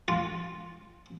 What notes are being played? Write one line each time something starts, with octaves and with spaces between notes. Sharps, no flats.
F4